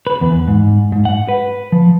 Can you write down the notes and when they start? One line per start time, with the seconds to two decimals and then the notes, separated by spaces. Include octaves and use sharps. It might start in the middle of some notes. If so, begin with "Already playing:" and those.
0.07 B4
0.21 E2
0.48 G#2
0.92 G#2
1.05 F#5
1.28 B4
1.72 F3